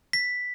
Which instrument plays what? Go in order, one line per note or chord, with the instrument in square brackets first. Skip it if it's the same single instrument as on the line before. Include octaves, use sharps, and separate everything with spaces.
[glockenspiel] B6